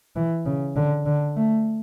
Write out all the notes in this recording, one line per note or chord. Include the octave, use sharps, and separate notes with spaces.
E3
C#3
D3
D3
A3